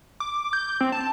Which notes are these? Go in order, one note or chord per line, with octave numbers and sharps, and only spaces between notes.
D6
G6
C4
A5